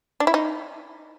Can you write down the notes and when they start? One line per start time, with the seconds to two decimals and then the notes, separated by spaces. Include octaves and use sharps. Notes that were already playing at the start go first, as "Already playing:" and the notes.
0.20 D4
0.27 E4
0.34 D#4